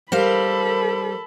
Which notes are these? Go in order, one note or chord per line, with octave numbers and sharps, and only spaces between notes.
G3 A4 A#4 C5 F5 B5